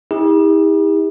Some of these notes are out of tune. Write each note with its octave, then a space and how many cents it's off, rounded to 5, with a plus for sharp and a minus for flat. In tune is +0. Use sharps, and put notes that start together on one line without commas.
E4 -45 G4 +45